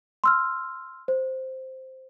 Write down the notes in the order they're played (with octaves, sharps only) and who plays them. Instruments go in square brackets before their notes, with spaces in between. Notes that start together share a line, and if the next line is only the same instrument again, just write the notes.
[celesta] C6 E6 F6
C5